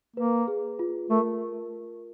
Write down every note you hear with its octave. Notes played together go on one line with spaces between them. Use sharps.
A#3 B4
G#4
F4
A3 A#4